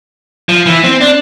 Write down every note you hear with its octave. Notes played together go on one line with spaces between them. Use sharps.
F3
E3
C4
D4